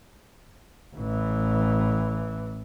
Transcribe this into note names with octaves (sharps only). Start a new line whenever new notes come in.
A1 E3